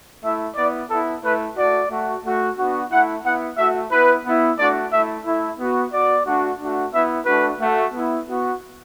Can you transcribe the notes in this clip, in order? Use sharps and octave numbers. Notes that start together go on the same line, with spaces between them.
A3 E4 E5
B3 E4 D5
B3 E4 A4
A3 E4 B4
A3 F#4 D5
A3 F#4
A3 F#4
B3 D4 F#4
A3 E4 F#5
B3 E4 F#5
A3 F#4 E5
B3 E4 B4
B3 E4
A3 D4 F#4 D5
A3 E4 E5
A3 E4
B3 F#4
B3 F#4 D5
A3 D4 F#4
A3 D4 F#4
B3 E4 E5
A3 D4 F#4 B4
A3 F#4
B3 E4
B3 F#4